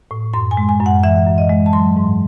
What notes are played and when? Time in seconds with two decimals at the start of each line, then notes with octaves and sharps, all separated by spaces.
0.11 A2
0.33 F#2 C6
0.51 G#5
0.57 G#3
0.69 G#5
0.80 F#2
0.86 F#5
1.03 E3 E5
1.26 F#2
1.38 D#5
1.49 G#3
1.66 A5
1.73 F#3 C6
1.97 G#2